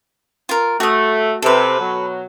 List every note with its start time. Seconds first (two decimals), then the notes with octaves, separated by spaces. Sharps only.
0.49 F4 A#4
0.80 A3 F#4 D#6
1.42 C3 A4 B4
1.78 B2 F#3